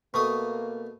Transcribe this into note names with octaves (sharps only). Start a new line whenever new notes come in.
B2 A3 A#3 C#6 D#6